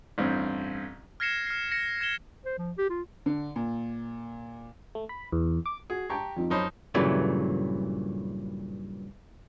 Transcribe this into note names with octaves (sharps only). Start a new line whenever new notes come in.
A1 G2 C4
F6 G#6 A#6 C7 C#7 E7
F6 C7
A#6 C#7
G#6 E7 G7
C5
F3
G4
F4
D3
A#2
A3
B5
E2
D6
F#4 G#4
G4 G5 A5 A#5 C#6
F2 C4 D#4
F#2 F3 D#4 C5 C#5 B5
G2 A#2 C#3 E3 F#3 A3